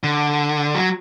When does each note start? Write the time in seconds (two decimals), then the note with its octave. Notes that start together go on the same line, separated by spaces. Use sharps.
0.04 D3
0.75 F#3